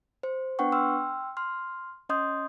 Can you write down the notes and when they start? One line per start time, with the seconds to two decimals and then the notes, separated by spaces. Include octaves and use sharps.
0.23 C5
0.59 B3 D4 B4 F#5 G5 C#6
0.72 G5 C6 E6 F6
1.37 C6 F6
2.09 C#4 D#5 C6 D#6 G6